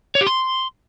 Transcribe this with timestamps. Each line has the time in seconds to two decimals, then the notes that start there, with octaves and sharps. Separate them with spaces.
0.15 C#5
0.21 G4
0.27 C6